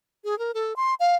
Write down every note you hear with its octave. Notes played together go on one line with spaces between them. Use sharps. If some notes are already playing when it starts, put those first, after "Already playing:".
G#4
A#4
A4
C6
F5